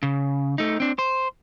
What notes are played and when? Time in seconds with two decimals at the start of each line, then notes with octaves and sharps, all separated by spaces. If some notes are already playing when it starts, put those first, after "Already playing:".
0.03 C#3
0.58 A3 D#4
0.80 C4 D4
0.99 C5